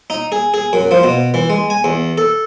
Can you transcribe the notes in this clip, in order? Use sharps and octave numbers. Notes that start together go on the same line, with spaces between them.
D#4
G#4
G#4
F#2
F3
B2
E3
G#3
G#5
E2
A4